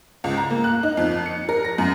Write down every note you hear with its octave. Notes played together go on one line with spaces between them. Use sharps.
C#2
A#5
A#3
F#6
D#4
F2
C#7
A#4
A#6
F#2